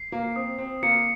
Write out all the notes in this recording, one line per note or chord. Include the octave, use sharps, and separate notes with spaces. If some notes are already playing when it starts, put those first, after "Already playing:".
Already playing: C7
A#3
C4 D#6
C4
A#3 C#7